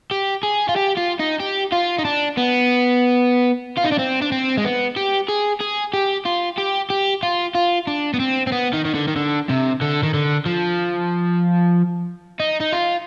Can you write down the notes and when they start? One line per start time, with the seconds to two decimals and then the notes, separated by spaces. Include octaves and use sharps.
0.11 G4
0.43 G#4
0.69 F4
0.76 G4
0.97 F4
1.19 D#4
1.40 G4
1.72 F4
1.98 D#4
2.05 D4
2.38 B3
3.78 F4
3.85 D#4
3.92 D4
3.99 C4
4.22 D4
4.32 C4
4.57 G#3
4.64 B3
4.96 G4
5.29 G#4
5.61 G#4
5.94 G4
6.25 F4
6.58 G4
6.90 G4
7.23 F4
7.55 F4
7.87 D4
8.14 B3
8.20 C4
8.47 C4
8.52 B3
8.73 D#3
8.85 D#3
8.94 D3
9.08 D#3
9.16 D3
9.49 C3
9.81 D3
10.03 D#3
10.14 D3
10.45 F3
12.40 D#4
12.60 D#4
12.73 F4